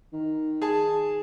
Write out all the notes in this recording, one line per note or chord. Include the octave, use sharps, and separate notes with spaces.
D#3
G#4 A5